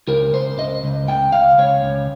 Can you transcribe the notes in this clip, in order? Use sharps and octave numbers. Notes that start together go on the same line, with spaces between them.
C#2 A#4
C#2 C5
C#2 D#5
C#2
C#2 G5
C#2 F5
C#2 C#5
C#2